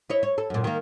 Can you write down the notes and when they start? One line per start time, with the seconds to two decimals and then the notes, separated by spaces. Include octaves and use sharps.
0.10 E4 C#5 D#5
0.23 C#5
0.38 A4
0.50 F#2 A#2
0.64 D#3 A#3